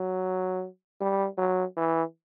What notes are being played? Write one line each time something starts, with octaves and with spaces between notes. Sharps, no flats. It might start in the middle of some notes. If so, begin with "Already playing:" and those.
Already playing: F#3
G3
F#3
E3